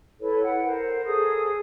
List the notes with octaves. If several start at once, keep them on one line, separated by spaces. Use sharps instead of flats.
E4 A4 B4 C#5
F#5 G5
A#4 C5
G#4 A4 D#6